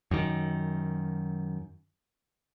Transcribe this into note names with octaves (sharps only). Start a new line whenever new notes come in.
F#2 D#3